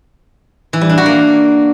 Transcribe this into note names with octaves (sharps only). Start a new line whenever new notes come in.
E3
G3
D4
F#4
A#3